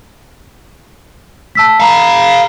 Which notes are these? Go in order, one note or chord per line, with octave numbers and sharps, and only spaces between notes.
A5 E6 B6
F5 A#5 B5